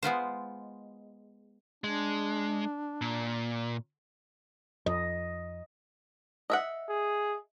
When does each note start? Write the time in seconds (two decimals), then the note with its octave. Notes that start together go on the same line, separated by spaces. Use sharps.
0.03 G#3 B3 F4 C5
1.84 G#3 D4
3.01 A#2
4.86 F2 D#5
6.50 D#5 E5 F#5
6.89 G#4